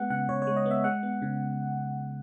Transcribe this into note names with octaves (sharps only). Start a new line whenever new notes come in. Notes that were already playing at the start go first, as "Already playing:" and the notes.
Already playing: G#3 B3 F#5
C#3 F#5
C#3 C#5
C#5
G#3
D#5
B3
E5
G#3 F#5
B3
C#3